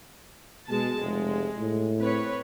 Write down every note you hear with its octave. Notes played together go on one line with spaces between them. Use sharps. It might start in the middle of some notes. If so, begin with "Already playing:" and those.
B2 G#3 A5
F1 G#3
A2
C4 B4 C#5